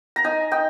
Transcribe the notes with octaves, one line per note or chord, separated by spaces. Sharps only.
A#5
D#4 G#5
D#4 G5